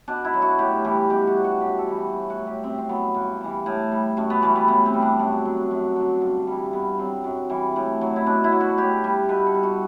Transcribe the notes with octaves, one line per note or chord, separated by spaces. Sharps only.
B2 D4
E4
F#3
F#4
A2 G4
E3 G3 G4
B2 G4
F#4
F#3
F#4
F#2 G4
A4
E3 G3
F#4
A2
F#4
F#3
G4
F#2 C4
C4
F#3 B3
G2
E3 G3
A2
G3
F#2 A3
B3
E3 G3 A3
B3
A2 B3
C4
G3
D4
F#2
F#3
F#2
D3 F#3
G2 D4
E3 G3
G2 B3
F#3 C4
F#2
E3 G3
A2
F#3
E4
B2 D4
E4
F#3
F#4
A2 G4
G3
B2 B4
A4
G3
F#4